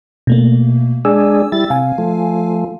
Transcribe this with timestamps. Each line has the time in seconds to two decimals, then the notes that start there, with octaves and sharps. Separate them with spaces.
0.27 B2 A3 A#3
1.05 G#3 D4 G#4 E6
1.52 G3 E4 A6
1.70 C3 F5 G#5
1.98 F3 A3